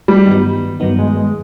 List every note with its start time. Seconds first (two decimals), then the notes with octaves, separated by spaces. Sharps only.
0.08 G3
0.26 G2 D#3 F#3 B3 D#4
0.80 G2 D#3 F#3 B3 D#4
0.99 G#3
1.17 G#3